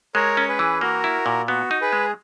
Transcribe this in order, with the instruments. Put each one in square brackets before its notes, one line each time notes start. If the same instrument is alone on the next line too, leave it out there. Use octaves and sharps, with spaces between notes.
[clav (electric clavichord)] G#3 [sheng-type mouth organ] A#4 C#5
[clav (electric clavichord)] C#4 [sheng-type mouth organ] C#5
[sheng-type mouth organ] G#4 B4
[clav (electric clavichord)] E3
[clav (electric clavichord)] A#3 [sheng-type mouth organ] F#4 A#4
[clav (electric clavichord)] E4
A#2
[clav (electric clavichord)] B3 [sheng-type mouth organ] F#4
[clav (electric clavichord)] D#4
[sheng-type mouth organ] G#4 B4
[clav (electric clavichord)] G#3